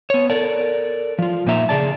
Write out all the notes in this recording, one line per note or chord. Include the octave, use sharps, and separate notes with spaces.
B3 C#5
A4 A#4 D5
F3 F4
A#2 F3 A#3 D#4 E5 A#5
C#3 G#4 D5 A5